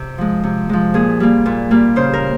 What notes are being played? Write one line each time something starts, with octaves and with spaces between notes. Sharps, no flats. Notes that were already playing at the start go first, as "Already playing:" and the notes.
Already playing: C3
F3 G#3
C3
F3 G#3
A#2 G#4
G3 A#3
A#2
G3 A#3
C#3 C5
A#4